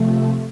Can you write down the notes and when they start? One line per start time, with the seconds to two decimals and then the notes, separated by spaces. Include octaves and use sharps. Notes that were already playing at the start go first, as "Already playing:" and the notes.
Already playing: C3 F3 A3